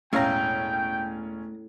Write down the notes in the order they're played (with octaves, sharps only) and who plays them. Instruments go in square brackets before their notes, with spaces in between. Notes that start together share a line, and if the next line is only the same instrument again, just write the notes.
[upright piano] E1 C#4 F5 [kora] A2 [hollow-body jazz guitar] A3 A#5 [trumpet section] G5